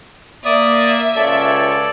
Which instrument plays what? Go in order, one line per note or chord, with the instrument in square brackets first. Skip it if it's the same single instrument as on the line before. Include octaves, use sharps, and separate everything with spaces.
[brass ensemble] A#3 [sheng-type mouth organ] D5 D#6 [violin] E5
[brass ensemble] C#2 F4 C#5 [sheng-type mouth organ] A4 D5